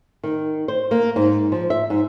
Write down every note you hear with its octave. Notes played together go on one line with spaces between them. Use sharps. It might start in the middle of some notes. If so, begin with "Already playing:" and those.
D#3
C5
A#3
G#2
F3
E5
G#2